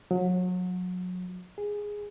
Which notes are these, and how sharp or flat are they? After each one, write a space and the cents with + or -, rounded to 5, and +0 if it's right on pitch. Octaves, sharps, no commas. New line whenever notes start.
F#3 -30
G#4 -5